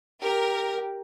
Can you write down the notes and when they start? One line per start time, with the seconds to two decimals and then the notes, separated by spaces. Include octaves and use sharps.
0.23 G4 A#4